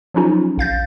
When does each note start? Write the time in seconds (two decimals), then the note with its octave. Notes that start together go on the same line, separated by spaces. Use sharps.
0.14 F3 F#3 C#4 D#4 F4
0.58 A#1 F5 G6 A6